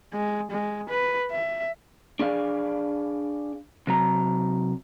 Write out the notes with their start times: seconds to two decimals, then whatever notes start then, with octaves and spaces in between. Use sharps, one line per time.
0.13 G#3
0.51 G#3
0.89 B4
1.31 E5
2.19 D4 G#4 D5 F5
3.87 C3 F#3 A#5